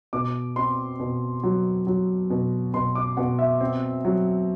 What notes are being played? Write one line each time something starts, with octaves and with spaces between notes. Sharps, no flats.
B2 D6
C4 C6
B2
F#3
F#3
B2
B2 C6
D6
B2 F#5
E5
C4
F#3